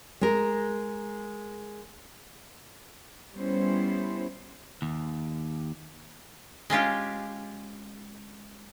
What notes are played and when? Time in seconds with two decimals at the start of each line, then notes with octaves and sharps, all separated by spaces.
0.21 G#3 A#4
3.35 G3 B3 C#4 E4 C5
4.82 D#2
6.70 G#3 C#4 F4 G4